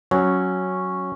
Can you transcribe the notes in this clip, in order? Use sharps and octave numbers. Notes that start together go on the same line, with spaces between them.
F#3 C#4